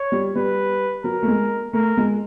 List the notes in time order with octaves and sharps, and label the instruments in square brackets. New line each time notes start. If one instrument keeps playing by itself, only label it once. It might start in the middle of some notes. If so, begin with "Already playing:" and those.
Already playing: [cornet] C#5
[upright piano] G3
[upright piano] G3 [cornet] B4
[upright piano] F#3 [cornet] A#4
[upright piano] A3
G#3
[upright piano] A3 [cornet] A#4
[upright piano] G#3